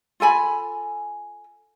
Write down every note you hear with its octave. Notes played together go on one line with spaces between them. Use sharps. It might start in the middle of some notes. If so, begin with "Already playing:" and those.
F4 A4 G#5 B5